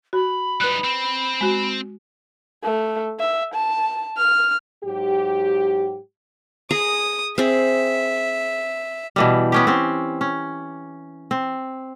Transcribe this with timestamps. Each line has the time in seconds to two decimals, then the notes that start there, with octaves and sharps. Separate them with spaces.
0.13 F#4 B5
0.61 G3 D#4 B4 F#6
0.84 C4
1.41 G#3 F#4
2.64 A3
3.20 E5
3.54 A5
4.17 F6
4.84 G#2 F#3 G4
6.71 G#4 A#5 D#6
7.38 C4 G#4 E5
9.16 B2 E3 G3
9.52 B3 C#4 G4
9.67 C4 C#4
10.21 C#4
11.31 C4